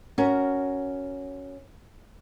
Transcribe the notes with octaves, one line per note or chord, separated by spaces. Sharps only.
C#4 F#4 A#4